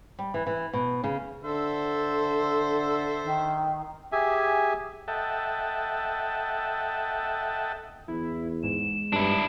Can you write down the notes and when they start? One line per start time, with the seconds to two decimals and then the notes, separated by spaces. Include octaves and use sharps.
0.19 G3
0.34 E3
0.47 E3
0.73 B2
1.04 C#3
1.44 D3 A4 C5 E5
3.24 D#3
4.12 G4 G#4 E5 G#5
5.08 A4 D#5 E5 F#5 G5 A5
8.08 E2 E4
8.63 G#2 E7
9.13 G2 D4 E4